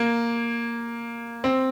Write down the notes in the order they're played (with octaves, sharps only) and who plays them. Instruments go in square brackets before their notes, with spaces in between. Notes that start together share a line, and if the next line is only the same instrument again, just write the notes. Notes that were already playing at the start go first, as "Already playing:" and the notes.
Already playing: [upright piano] A#3
C4